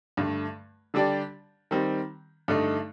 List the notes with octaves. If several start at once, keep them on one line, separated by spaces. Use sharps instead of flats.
G2 D3 A3
D3 G3 D4 G4 D5
D#3 G3 C4
G2 D3 A3 D#4